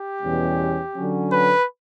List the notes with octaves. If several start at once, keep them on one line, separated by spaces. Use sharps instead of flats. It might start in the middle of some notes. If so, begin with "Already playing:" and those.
Already playing: G4
E2 B2 G3 C#4
D3 F#3 C#4
B4